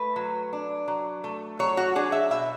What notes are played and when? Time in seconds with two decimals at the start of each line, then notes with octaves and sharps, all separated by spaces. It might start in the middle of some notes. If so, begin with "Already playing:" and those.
Already playing: A3 B4
0.16 F#3
0.53 D4
0.88 F#3
1.24 A3
1.59 F#3 C#5
1.77 F#4
1.95 D4 G#4
2.12 E5
2.30 B2 E5